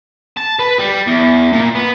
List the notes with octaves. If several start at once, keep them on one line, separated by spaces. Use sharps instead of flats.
A5
B4
G3
E2
A#2
B3